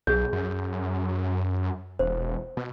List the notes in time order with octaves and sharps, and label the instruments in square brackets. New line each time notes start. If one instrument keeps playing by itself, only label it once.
[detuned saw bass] B1 [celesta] G#4 G6
[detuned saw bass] F#2
[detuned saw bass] E1 [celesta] C5
[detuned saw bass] B2